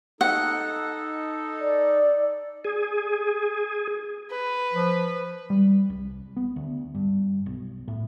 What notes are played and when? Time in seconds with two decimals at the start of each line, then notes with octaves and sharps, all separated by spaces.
0.21 D#4 A4 F#5
1.61 D5
2.65 G#4
4.31 B4
4.73 F3
5.50 G3
5.90 C2
6.37 B3
6.56 D2
6.95 G2
7.46 B1
7.88 A2